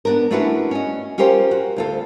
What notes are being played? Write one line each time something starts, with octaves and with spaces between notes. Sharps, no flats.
B3 D4 A#4
A3 C#4 D4 E4 F#4 B4
C#4 D#5
C#4 F4 G4 A#4 C5
F#4
D2 F4 A4